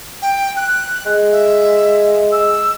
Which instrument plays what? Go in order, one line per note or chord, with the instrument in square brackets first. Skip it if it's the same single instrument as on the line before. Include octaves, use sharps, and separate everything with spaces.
[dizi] G5
F#6
[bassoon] G#3
[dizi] E5
E6